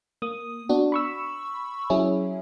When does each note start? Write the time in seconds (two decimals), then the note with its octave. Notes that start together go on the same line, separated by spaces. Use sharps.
0.22 A#3 D#6
0.69 B3 D4 F#4
0.92 B5 C#6 E6
1.90 F#3 C#4 E4 G#4